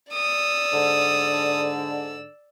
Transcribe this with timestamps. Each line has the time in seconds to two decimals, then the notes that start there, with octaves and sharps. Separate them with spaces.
0.13 D5 D#6 E6
0.73 G#2 D3